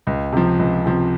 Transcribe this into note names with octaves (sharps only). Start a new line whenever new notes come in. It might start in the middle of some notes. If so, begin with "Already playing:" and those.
C#2
C3 F3
C#2
C3 F3